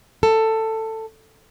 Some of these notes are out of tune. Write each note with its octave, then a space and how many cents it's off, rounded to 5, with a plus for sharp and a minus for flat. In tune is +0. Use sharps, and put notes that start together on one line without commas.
A4 +15